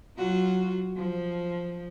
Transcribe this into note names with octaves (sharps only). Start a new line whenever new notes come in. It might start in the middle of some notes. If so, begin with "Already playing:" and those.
F#3 F4 F#4
F3